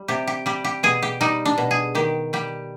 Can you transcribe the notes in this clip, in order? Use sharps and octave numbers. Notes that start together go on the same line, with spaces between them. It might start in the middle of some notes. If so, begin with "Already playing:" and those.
Already playing: G3
C3 G4
G4
G3 G4
G4
B2 G#4
G4
G3 D#4
D4
B2
G#4
D#3 G4
G3 G4